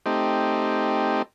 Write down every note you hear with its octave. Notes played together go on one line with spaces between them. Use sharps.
A3 C4 D#4 G4